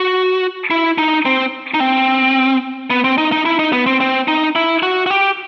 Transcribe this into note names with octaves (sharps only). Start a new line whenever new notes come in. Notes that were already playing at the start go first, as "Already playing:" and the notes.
Already playing: F#4
E4
D#4
C4
D#4
C4
B3
C4
D#4
D#4
E4
D#4
B3
C4
C4
D#4
E4
F#4
F#4
G4